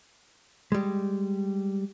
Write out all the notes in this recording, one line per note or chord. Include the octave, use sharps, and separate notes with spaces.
G3 G#3